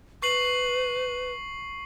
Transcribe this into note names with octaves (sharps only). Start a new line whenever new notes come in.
B4 C#6 C7 F#7